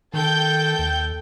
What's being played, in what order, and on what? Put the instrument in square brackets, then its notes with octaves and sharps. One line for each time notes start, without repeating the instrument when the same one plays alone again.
[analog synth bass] D#3 [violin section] A4 G5 G6
[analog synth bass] D#2